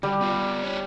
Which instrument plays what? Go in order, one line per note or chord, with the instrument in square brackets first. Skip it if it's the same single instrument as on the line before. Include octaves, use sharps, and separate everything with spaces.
[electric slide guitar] D3 [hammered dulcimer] G3
[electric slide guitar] B3 F4
D4 C#5